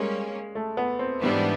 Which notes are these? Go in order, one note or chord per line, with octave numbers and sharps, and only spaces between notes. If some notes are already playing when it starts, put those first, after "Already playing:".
Already playing: G3 G#3 A#3 C#4
A3
B3
C4
G#2 E3 G3 B3 D4